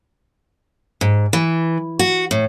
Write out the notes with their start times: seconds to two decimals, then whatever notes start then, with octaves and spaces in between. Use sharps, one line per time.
1.01 G#2
1.33 E3
1.99 F#4
2.31 A2